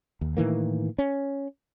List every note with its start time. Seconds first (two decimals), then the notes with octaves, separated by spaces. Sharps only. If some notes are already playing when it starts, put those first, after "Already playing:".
0.21 D#2
0.37 A2 D#3 E3 A#3
0.98 C#4